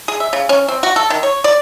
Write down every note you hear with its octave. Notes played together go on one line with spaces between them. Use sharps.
G#4
E5
C#3
C#4
C4
F#4
A4
D#3
C#5
D5